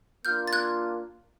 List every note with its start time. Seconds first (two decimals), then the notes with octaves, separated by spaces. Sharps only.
0.25 A#3 D4 F4 F6 G6
0.47 A6
0.53 F#6 G#6